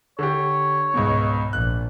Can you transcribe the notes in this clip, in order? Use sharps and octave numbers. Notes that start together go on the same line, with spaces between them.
D3 G4 C#5
C#2 G#2 B2
A#1 F#6